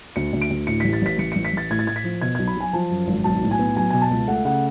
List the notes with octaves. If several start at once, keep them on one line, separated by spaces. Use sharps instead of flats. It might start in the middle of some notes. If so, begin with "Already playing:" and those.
D2 C#7
D2
D7
D2
A2 C#7
A1 B6
A6
A1 B6
A1 C#7
A1 C#7
B6
A1 A6
A2 G#6
A6
A2 G#6
B6
F3
B2 G#6
B1 G#6
B5
F#3 G#5
F3 A5
F#2
G#1
B1 A5
A2
G#5
B3
F#3 G#5
B2 G#5
A5
C#2
A3 F#5
C#3 F#5